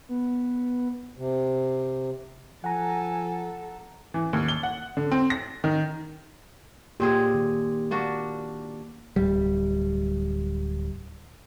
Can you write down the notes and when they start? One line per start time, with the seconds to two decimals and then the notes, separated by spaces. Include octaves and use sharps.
0.09 B3
1.17 C3
2.64 F3 A4 F#5 G#5 A#5
4.14 E3
4.33 D#2
4.48 G7
4.63 F#5
4.97 D3
5.12 C4
5.30 A#6
5.64 D#3
7.00 A#2 A#3 C4 G4 G#4
7.35 D#3
7.91 A#3 D4 F#4
9.16 D1 G3